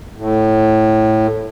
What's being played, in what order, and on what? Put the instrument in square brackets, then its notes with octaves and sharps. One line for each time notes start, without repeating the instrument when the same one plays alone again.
[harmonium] A2